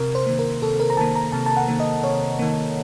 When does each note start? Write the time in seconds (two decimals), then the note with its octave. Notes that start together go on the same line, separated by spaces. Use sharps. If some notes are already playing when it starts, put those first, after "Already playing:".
Already playing: C3 A#4
0.15 C5
0.27 D#3 A#3
0.39 A#4
0.62 C3 A4
0.80 A#4
0.90 A#5
0.97 D#3 A#3 A5
1.15 A#5
1.32 C3 A5
1.46 A5
1.57 F#5
1.68 D#3 A#3
1.80 D#5
2.03 C3 C#5
2.39 D#3 A#3